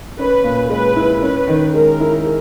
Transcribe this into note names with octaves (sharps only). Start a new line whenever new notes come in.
C#4 B4
A#2
G#3 B4
E4
C#4 B4
D#3
G#3 A#4
E4
G#4